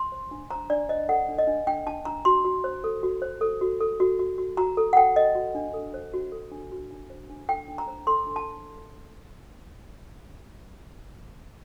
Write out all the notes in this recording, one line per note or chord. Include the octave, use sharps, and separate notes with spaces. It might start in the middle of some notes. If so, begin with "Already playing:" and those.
Already playing: C6
C5
D4
C5 A#5
D4 D5
C5 D#5
A4 F#5
D4
D#5
D4
D4 G5
D4 A5
D4 A#5
F#4 C6
F#4
C5
A4
F#4
C5
A4
F#4
A4
F#4
F#4
F#4
F#4 A#5
A4
F#5
A4 G5
A4 D#5
F#4
D4
A4
C5
F#4
A4
D4
F#4
D4
C5
D4
A4 G5
D4
A#5
C5
A4 C6
D4
A5